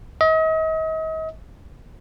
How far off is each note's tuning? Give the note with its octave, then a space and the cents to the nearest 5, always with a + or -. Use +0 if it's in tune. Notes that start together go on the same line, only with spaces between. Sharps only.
D#5 +40